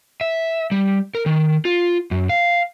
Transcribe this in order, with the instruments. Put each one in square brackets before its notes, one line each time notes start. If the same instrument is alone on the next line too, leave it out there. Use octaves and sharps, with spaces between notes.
[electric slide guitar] E5
G3
A#4
D#3
F4
F#2
F5